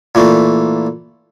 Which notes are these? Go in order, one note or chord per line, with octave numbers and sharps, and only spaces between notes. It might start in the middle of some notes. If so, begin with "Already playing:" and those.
A#2 E3 A3